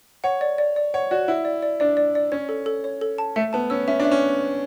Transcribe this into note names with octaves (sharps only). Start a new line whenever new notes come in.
C#5 F#5
D5
D5
D5
C#5 F#5
F#4 D5
E4 F#5
D5
D5
D4 D5
D5
D5
C#4 C#5
A4
A4
C#5
A4
A5
A3 E5
B3 A5
C#4 E6
C#4 E5
D4
E5
C#4